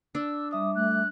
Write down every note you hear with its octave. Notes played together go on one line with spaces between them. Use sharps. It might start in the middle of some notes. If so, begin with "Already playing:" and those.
D4 E6
G3 E5 D6 D#6
A3 F#6